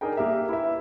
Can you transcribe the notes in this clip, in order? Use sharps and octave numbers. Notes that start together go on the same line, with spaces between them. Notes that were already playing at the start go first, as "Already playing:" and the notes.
D4 D#4 G#4 A#4 G5
A#3 G4 A#4 E5
E4 B4 E5